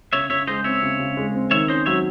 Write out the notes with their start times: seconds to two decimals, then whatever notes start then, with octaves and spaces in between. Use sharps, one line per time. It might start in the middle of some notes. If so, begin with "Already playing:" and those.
0.13 C#3 C#5 E5
0.29 C#3 C#5 E5
0.47 G#3 C5 D#5
0.64 C4 C#5 E5
0.82 C#3
0.99 C#3
1.17 G#3
1.35 C4
1.51 D#3 C#5 E5
1.68 C#4 C5 D#5
1.86 F#3 C#5 E5